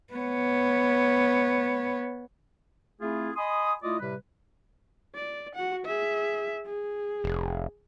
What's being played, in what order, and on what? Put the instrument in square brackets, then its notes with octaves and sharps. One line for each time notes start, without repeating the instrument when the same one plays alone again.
[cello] B3 C#5
[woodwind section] A3 C4 E4 F4 G#4
D#5 G#5 B5 C6 D#6
A3 E4 F4 D5 D#5 D#6
A2 C3 G3 B4
[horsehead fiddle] D5
F#4 F#5
G#4 E5
G#4
[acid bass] F1